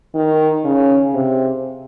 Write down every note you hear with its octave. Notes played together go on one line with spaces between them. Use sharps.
D#3
C#3
C3